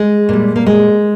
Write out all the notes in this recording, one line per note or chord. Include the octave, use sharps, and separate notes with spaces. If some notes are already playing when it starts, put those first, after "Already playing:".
Already playing: G#3
A#2 G3
A#3
G#3